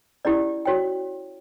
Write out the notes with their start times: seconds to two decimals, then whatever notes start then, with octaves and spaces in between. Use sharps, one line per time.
0.25 C#4 E4 G4 D5
0.65 F#4 C#5 G5